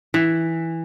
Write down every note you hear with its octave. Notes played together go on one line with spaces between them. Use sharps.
E3